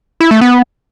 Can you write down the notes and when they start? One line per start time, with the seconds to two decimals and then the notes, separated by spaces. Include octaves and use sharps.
0.20 E4
0.31 A3
0.41 B3